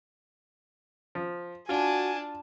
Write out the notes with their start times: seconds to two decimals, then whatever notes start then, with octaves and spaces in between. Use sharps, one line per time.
1.15 F3
1.69 D4 F4 F#4 G#5 A5